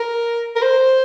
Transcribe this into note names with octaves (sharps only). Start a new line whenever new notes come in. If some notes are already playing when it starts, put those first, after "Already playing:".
Already playing: A#4
A#4
C5